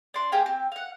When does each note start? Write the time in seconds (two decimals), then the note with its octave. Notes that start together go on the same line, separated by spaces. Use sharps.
0.14 D4 C6
0.32 A#3 G4 G#4 F5
0.46 C4
0.72 F5 F#5